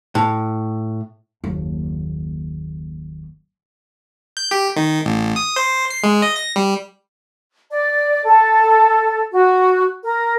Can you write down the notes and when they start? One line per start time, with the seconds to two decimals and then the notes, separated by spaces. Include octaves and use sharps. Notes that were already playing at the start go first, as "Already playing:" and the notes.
0.15 A2
1.44 F#1 D#2
4.37 G6
4.51 G4
4.76 D#3
5.06 A1
5.36 D#6
5.56 C5
5.90 C7
6.03 G#3
6.22 D#5
6.36 A#6
6.56 G3
7.70 D5
8.26 A4
9.31 F#4
10.03 A#4